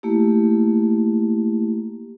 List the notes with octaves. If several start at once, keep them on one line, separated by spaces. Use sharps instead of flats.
A3 A#3 E4 G4